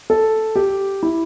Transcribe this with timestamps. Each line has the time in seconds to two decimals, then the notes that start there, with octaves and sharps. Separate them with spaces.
0.10 A4
0.56 G4
1.03 E4